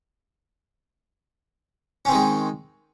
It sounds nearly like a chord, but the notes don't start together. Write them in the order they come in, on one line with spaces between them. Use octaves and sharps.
C#4 C4 D#3 G#3